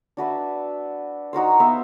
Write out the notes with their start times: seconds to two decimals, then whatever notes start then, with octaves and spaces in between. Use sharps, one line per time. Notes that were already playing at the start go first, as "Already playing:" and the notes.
0.17 D4 F#4 B4 E5
1.33 D#4 F#4 A#4 C5
1.60 B3 C5 E5 F5